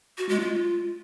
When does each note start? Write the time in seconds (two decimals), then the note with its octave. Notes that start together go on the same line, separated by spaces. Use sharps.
0.18 F#4
0.29 G#3
0.40 F4